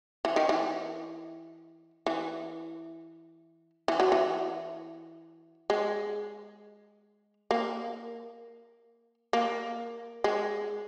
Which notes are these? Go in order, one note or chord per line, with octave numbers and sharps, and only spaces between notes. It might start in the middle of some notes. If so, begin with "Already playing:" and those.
E3
D#3
E3
E3
E3
F#3
E3
G#3
A#3
A#3
G#3